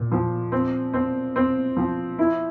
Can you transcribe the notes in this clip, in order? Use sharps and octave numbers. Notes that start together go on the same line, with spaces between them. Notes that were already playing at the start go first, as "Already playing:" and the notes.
Already playing: A#2
F3
C4
C4
C4
F3
E4